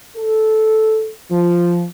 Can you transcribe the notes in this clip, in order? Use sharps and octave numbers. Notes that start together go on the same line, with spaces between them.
A4
F3